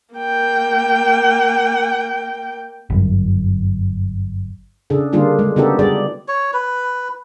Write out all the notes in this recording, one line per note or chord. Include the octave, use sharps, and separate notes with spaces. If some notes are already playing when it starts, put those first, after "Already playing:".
A#3 G5
G1 F#2
C#3 D4 G#4 A4
D3 G3 A#3 D4 F4 G#4
G#3
C#3 B3 D#4 F#4 G4 A4
G3 F#4 G#4 D5
C#5
B4